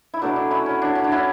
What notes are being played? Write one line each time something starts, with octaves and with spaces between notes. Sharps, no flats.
E4
B2 F#3 A3 D4
D4
C#4 E4
C#4
D4
C#4
D4
C#4 E4